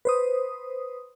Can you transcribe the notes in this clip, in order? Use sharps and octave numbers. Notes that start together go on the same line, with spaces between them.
B4 C5 D#6